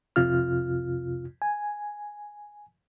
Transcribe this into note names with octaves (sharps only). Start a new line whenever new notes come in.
C2 F2 C3 F4 F6
G#5